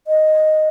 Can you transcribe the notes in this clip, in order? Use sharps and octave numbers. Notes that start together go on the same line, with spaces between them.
D#5